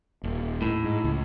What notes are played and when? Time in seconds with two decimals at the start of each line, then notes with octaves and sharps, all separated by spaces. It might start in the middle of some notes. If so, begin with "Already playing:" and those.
0.23 D#1
0.62 A2
0.84 G#2
1.04 C#2